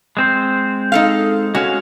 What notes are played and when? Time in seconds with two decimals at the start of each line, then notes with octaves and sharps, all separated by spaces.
0.17 G#3 C4 C5
0.92 D#4 A4 F5
1.55 G#3 C#4 F#4 F5